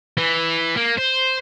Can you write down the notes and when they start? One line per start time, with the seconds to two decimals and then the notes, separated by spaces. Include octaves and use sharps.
0.18 E3
0.76 A#3
0.97 C5